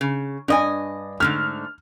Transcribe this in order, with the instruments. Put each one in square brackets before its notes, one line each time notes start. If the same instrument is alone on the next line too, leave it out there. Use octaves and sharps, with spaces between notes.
[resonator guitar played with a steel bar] C#3
[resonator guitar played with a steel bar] G2 D#5 G#5 [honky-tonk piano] D4
[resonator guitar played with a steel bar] G#2 D3 A3 [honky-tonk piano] F6